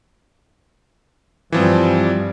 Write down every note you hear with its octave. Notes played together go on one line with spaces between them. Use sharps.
G2 E3 F3 G3 C4